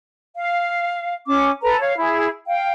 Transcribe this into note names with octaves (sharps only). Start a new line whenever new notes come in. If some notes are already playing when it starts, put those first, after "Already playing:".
F5
C#4 D6
A4 B4 A#5
C#5 F5
E4 G#4
F5 G5